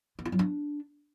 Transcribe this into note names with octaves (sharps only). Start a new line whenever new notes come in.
B3
F4
F#3
D4